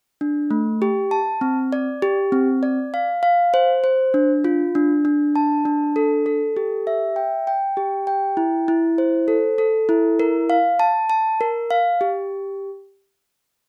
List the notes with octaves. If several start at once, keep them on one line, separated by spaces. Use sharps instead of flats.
D4
A3
G4
A5
C4
D5
G4
C4
D5
F5
F5
C5
C5
D4
F4
D4
D4
A5
D4
A4
A4
G4
E5
G5
G5
G4
G5
E4
E4
C5
A4
A4
E4
A#4
F5
A5
A5
A#4
F5
G4